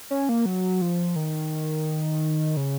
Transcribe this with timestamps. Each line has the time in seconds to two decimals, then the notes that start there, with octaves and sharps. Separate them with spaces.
0.11 C#4
0.29 A#3
0.46 F#3
0.81 F3
1.16 D#3
2.57 C#3